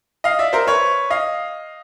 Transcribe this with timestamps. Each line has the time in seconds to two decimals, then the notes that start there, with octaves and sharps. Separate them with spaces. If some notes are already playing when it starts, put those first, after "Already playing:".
0.24 D#5 F5
0.39 D5 E5
0.53 A#4 C5
0.67 B4 C#5
1.10 D#5 F5